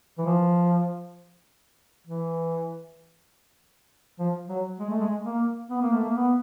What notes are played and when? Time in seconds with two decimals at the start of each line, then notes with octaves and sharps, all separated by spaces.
0.18 E3
0.26 F3
2.07 E3
4.19 F3
4.49 F#3
4.80 G#3
4.90 A3
5.01 G#3
5.25 A#3
5.70 B3
5.82 A#3
5.93 A3
6.04 A#3
6.15 B3